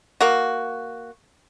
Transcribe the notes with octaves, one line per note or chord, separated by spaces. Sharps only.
A#3 F#4